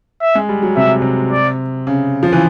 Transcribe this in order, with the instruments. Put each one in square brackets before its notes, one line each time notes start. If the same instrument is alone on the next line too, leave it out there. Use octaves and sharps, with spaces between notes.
[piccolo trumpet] E5
[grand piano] G#3
G3
F#3
[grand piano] C3 [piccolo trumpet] E5
[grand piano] C3
[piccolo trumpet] D5
[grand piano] C#3
F3
E3